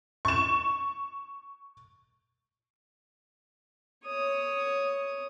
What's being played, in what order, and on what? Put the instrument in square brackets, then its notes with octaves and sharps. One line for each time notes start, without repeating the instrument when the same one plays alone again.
[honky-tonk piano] C#6 E7
[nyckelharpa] C#5 D#6